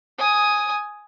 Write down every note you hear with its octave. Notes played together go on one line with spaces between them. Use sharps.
G#5 D#6